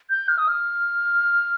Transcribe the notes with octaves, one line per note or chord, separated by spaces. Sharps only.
G6
F6
D#6
F6